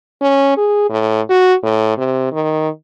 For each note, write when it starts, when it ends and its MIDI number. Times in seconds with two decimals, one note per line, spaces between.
0.22 0.56 61
0.57 0.88 68
0.90 1.21 45
1.30 1.54 66
1.63 1.93 45
1.98 2.31 48
2.32 2.69 51